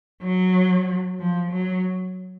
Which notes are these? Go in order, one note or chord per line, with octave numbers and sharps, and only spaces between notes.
F#3
F3
F#3